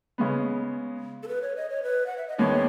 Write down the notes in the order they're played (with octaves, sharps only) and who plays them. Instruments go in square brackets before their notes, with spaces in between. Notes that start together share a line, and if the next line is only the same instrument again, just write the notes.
[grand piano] C#3 G#3 B3
[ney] A4
B4
C#5
D#5
C#5
B4
F#5
E5
D#5
[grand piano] D#2 D#3 G#3 B3 [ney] C#5